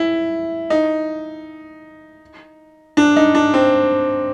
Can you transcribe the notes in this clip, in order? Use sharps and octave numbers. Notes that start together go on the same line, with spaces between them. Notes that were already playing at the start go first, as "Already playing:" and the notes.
Already playing: E4
D#4
D4
D#4
D4
C4